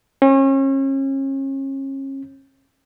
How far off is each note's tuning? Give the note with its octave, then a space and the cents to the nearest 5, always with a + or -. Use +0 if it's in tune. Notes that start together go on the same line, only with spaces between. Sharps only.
C#4 -35